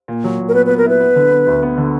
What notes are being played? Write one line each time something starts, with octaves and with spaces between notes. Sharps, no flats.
A#2
F#3
A#2
A#4
B3 B4
B4
B3
A#4
E4 B4
B3
D3
B3
D2
B3
D3